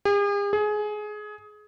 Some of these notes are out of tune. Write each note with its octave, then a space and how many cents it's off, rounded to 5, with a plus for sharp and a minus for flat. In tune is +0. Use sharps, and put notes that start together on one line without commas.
G#4 -45
G#4 +20